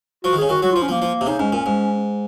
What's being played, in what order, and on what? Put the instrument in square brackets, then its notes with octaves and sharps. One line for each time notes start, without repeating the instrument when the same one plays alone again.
[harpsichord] F3 [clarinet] F#4
[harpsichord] D#3
[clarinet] G#4
[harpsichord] C#3
[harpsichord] D#3 [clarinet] F#4
[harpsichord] F#3 [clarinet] F#4
[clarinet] F4
[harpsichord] F3
[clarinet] C#4
[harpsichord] F3 [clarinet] A#3
[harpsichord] F3
C3
[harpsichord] C#3 [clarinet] D#4
[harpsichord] G#2 [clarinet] C#4
[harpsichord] A#2
G#2